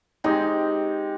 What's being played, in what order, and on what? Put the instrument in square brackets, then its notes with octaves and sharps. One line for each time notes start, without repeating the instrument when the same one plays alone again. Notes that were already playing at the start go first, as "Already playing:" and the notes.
[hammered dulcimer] G#3 C4 G4 [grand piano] D#4